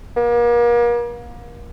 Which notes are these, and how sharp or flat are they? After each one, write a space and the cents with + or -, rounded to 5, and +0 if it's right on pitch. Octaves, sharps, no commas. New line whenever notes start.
A#3 +40